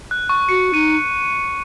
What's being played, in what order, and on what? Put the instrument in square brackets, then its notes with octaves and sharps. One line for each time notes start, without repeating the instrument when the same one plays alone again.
[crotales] F#6
C#6
[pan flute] F#4 [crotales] C#7
[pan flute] D#4 [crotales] D#7